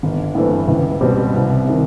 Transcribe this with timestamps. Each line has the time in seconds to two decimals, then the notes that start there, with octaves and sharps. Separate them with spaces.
0.03 G1
0.35 G2 E3 A3 C4
0.68 C#2
1.01 B2 G3 C4
1.34 C2
1.65 C3 D#3